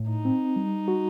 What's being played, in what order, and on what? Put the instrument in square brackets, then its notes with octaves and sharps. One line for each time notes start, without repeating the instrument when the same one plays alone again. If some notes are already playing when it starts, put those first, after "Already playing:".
Already playing: [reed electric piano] A2
[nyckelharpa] D#4
[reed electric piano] C4
G3
F#4